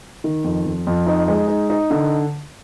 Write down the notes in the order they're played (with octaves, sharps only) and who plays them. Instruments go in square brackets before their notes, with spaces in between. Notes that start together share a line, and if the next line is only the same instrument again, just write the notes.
[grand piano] D#3
F2
F2
F2
D#4
G#3
D#4
D#4
D3